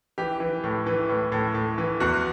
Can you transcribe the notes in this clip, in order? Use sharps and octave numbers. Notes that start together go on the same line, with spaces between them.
E3 G4
E3
A2
E3
A2
A2
A2
E3
E2 F#4